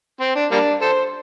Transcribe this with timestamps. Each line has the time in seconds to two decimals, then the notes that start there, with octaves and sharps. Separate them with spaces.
0.21 C4
0.35 D4
0.51 G3 A#3 D4
0.81 A4 C5